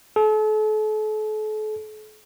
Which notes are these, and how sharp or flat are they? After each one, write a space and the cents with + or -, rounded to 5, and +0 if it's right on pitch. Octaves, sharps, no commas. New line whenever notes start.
A4 -40